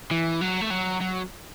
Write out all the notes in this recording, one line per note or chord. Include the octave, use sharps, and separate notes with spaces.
E3
F#3
A3
F#3
F#3